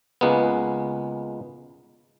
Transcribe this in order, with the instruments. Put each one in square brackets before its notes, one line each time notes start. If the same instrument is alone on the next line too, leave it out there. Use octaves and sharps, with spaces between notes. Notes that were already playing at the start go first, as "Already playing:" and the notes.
[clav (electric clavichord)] C#2 G#3 A#3 B3